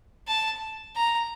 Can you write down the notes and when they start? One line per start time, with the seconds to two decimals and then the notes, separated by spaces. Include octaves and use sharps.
0.28 A5
0.96 A#5